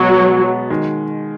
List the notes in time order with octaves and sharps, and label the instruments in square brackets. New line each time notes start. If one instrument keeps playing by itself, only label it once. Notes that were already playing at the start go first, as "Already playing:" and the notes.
Already playing: [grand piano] B2 G#3 B3 [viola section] F#3
[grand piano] D#3 G#3